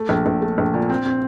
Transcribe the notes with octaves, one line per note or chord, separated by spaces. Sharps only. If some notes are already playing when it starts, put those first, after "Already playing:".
Already playing: A3
A#1
A#1
A3
A#1
A#2
C4
C4